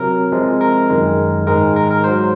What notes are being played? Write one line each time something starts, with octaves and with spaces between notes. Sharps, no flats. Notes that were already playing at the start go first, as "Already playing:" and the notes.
Already playing: C3 F#3 A#4
C3 F3 G#3
A#4
F#2 D#3 G#3
G#2 D#3 G#3 A#4
A#4
A#4
G#2 F#3 C5